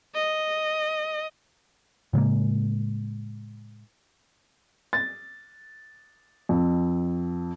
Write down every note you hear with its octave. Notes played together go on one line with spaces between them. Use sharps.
D#5
A2 C#3 G#3 A#3
A6
F2